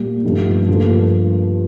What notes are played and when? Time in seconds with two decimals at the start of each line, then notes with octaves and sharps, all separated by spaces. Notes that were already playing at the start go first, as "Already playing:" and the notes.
Already playing: A#2 G3
0.24 G2 F3 A3 D#4 G4
0.68 G2 F3 A#3 F4 A4